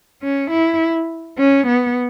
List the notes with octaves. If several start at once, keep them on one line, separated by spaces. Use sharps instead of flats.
C#4
E4
C#4
B3